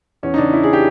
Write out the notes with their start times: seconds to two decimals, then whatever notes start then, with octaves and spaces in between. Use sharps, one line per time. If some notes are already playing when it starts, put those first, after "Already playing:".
0.23 E2 C#4
0.34 D#4
0.38 C#3 D4
0.53 E3 E4
0.63 G#4
0.73 G4